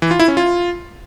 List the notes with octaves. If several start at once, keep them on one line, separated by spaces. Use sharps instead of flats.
E3
F4
E4
C#4
F4